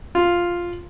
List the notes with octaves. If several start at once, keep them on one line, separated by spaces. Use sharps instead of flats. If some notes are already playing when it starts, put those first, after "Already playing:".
F4